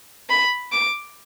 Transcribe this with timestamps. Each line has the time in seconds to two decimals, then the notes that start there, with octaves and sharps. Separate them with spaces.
0.30 B5
0.72 D6